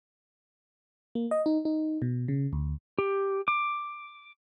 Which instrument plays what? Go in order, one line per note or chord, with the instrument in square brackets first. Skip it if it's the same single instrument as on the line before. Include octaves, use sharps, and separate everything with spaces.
[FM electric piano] A#3
D#5
D#4
D#4
B2
C#3
D2
[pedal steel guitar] G4
D6